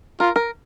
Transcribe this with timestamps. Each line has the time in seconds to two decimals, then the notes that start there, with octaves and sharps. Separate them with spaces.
0.20 F4 A#4
0.36 A#4